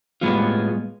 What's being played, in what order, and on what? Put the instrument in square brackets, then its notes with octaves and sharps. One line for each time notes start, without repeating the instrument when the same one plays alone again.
[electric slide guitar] A2 G3 G#3 B3 F4